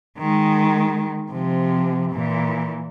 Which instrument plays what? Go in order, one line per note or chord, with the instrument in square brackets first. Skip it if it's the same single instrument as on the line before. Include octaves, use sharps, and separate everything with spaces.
[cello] D#3 G#3
C3 F3
A#2 E3